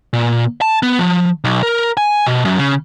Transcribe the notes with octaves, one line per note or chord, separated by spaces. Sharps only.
A#2
A5
B3
F3
B1
A#4
G#5
B2
F#2
C#3